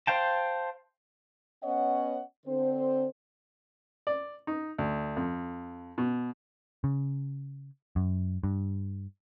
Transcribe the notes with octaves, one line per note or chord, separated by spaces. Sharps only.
C5 F5 G5 A5
B3 C#4 C#5 D#5 F#5
D3 C4 C5
D5
D#4
D2
F2
B2
C#3
F#2
G2